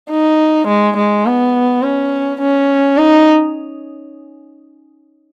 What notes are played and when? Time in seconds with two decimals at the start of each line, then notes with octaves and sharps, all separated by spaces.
0.11 D#4
0.68 G#3
0.97 G#3
1.26 B3
1.83 C#4
2.41 C#4
2.98 D#4